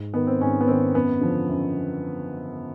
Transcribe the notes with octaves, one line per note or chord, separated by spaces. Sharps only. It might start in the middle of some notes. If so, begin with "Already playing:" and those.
Already playing: G#2
D#3 B3
C4
G#2 C#4
B3
D#3 C4
F#2 B3
D3 F3
F#2